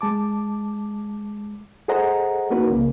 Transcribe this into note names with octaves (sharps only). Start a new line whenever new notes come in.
G#3 A5 D6
G#4 A4 C5 D#5 F#5 A#5
A#3 C#4 D#4 F#4 A#4 B4
C2 C#3 A#3